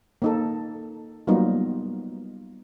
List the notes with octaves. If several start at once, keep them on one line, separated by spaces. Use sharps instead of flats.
A#3 D#4 A4
F#3 G3 A#3 B3 D#4 F4